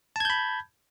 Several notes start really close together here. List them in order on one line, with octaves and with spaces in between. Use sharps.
A5 G#6 G6 B5